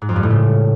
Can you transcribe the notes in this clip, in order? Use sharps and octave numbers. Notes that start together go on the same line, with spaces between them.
G#2
F2
G2
A2
C#3